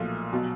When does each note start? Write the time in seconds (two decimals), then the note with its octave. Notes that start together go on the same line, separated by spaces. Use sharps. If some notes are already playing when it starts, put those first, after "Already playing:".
Already playing: B1 A#2 F3 A3
0.33 B2 F#3